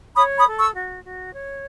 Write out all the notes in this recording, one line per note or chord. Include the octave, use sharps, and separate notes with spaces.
C#5 B5 D#6
B5 D#6
A4
C#6 E6
F#4
F#4
C#5